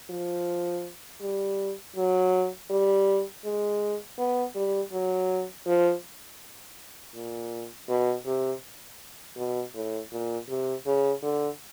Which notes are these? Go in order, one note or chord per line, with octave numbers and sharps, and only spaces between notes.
F3
G3
F#3
G3
G#3
B3
G3
F#3
F3
A#2
B2
C3
B2
A2
A#2
C3
C#3
D3